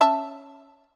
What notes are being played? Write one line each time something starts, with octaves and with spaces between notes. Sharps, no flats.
C#4 E5 A5